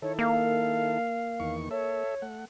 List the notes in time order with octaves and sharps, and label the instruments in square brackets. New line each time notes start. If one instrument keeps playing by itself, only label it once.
[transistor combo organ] D#3 E4 A4 [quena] C#5
[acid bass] A#3 [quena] F5
[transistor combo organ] E2 D#3 C#6
[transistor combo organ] A4 E5 [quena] C#5
[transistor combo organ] A3 F#5